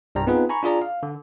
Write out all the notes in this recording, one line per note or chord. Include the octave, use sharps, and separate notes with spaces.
C2 G2 G3 A#5
B3 C4 D#4 F4 G#4 B4
G#5 A#5 B5 C#6
D4 F4 G#4 D5 A#5
F5
D3